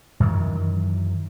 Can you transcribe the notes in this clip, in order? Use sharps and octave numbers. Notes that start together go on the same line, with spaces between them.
F#2 D#3 E3 F#3